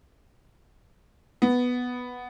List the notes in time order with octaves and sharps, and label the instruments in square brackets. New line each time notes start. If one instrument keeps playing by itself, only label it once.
[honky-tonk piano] B3